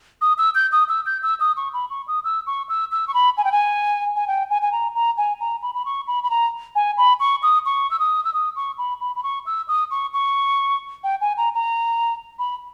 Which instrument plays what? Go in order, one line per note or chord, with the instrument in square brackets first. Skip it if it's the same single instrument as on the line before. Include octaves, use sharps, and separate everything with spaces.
[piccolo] D#6
E6
G6
D#6
E6
G6
E6
D#6
C#6
B5
C#6
D#6
E6
C#6
E6
E6
C#6
B5
G#5
G5
G#5
G#5
G5
G#5
G#5
A#5
A#5
G#5
A#5
B5
B5
C#6
B5
B5
A#5
G#5
B5
C#6
D#6
C#6
E6
D#6
E6
D#6
C#6
B5
B5
B5
C#6
E6
D#6
C#6
C#6
G5
G#5
A#5
A#5
B5